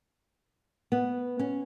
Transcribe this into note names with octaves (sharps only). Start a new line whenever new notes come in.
B3
C#4